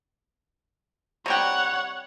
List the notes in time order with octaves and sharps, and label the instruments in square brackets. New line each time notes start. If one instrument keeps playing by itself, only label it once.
[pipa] C3 G3 G5 [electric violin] C#5 F#5